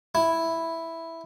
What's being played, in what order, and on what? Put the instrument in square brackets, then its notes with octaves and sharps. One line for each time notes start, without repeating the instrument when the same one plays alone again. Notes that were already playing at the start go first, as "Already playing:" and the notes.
[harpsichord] E4